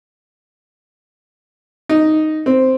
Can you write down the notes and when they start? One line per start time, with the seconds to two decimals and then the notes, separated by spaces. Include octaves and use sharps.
1.89 D#4
2.46 C4